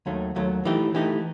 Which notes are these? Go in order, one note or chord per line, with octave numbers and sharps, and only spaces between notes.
D#2 D#3 F#3 A3
D#2 D#3 F#3 A3
E3 A3 D#4 G4
E3 A3 D#4 G4